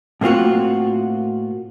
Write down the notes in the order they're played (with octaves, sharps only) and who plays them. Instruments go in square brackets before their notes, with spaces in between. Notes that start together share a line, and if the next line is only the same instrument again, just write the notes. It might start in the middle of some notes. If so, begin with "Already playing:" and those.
[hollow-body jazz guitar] A2 A#3 C4 F4 F#4